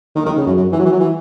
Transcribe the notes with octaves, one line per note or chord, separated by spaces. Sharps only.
D#3
D#3
C#3
F#2
F#2
E3
F#3
E3
F#3
E3